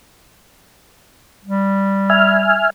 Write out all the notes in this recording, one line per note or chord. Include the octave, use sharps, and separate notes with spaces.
G3
E5 G#5 F6